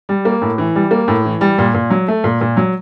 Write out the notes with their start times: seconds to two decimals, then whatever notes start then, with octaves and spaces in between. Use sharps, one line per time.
0.09 G3
0.25 A#3
0.42 A2
0.58 E3
0.76 G3
0.91 A#3
1.08 A2
1.25 E3
1.41 G3
1.58 A#2
1.74 A#2
1.90 F#3
2.08 A3
2.24 A#2
2.41 A#2
2.57 F#3